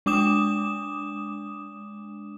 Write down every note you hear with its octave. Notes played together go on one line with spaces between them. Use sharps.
G#3 D4 D6 D#6 E7